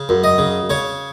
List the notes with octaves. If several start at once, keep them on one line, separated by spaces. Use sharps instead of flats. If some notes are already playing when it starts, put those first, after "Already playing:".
Already playing: C#3
F#2
D#5
C#3
C#3 C#5